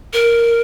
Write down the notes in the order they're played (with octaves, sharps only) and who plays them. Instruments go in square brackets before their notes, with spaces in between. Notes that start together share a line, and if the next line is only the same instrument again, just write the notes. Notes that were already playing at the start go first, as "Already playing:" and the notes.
[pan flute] A#4